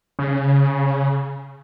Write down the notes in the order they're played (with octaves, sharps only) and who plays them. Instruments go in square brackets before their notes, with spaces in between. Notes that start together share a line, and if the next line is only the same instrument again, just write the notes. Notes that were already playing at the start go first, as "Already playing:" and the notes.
[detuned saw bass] C#3